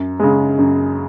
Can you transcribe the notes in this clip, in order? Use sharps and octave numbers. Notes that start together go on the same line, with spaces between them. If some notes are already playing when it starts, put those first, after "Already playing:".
Already playing: F#2
C#3 G#3
F#2